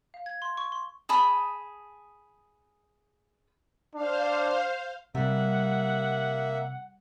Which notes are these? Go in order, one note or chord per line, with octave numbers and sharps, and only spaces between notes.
F5
G#6
C6
C#6
C6
G#4 A5 B5 D#6
D4 C5 F5
C3 G3 A#3 E5 F#5